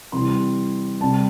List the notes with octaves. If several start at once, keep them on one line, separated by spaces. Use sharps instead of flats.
C3 E3 G3 C6
C3 G3 A5